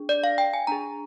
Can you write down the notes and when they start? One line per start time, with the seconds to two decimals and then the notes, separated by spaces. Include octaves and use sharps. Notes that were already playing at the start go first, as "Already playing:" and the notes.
Already playing: D4 G#4
0.09 D5
0.24 F5
0.38 G5
0.54 G#5
0.67 D4 G#4 A#5